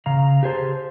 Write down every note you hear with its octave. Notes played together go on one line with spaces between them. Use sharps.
C#3 F5 A#5
G4 G#4 C5 A5